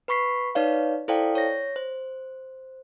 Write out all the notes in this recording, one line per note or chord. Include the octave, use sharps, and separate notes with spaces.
B4 B5 C#6 B6 C7
D#4 B4 C#5 D5 F5
E4 A4 C5 D5 F5 G5
C#5 A#6
C5